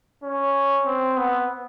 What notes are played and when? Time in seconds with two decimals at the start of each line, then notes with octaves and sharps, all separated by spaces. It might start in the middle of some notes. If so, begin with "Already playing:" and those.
0.23 C#4
0.86 C4
1.17 B3